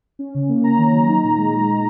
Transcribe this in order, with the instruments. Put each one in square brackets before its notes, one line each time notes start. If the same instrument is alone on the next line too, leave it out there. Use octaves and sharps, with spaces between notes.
[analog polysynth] C#4
C#3
A#3
C#4 A#5
D#3
F#3
D#4
A#2
G#3